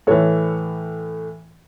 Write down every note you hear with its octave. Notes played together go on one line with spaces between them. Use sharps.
A2 E3 A4 C#5